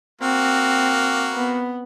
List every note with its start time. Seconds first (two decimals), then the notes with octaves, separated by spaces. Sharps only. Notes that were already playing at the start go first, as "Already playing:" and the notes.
0.22 A#3 C4 F#4
1.33 B3